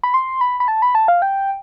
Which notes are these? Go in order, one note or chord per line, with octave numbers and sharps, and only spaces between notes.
B5
C6
B5
B5
A5
B5
A5
F5
G5